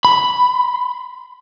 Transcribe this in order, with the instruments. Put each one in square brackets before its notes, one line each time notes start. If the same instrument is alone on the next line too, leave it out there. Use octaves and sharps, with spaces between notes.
[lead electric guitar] B5